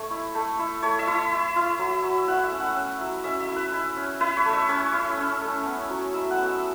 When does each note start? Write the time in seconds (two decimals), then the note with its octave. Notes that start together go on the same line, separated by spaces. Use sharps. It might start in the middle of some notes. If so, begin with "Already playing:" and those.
Already playing: A3 C#5
0.11 E4
0.35 A3
0.59 E4
0.83 A3 C#5
0.99 E5
1.07 E4
1.15 E5
1.31 E4
1.56 E4
1.79 F#3
2.03 F#3
2.28 E4 F#5
2.44 E5
2.52 C#4
2.60 F#5
2.76 C#4
3.01 F#3
3.24 C#4 E5
3.40 E5
3.49 E4
3.56 B4
3.73 E4
3.97 C#4
4.20 E4 B4
4.37 C#5
4.45 A3
4.53 E5
4.69 C#4 C#5
4.94 E4
5.17 C#4
5.41 A3
5.66 B3
5.90 F#3
6.13 E4 E5
6.31 F#5
6.38 B3
6.46 E5